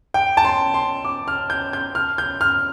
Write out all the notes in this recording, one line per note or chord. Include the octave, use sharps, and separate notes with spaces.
G5
A5
C6
C6
D6
F6
G6
G6
F6
G6
F6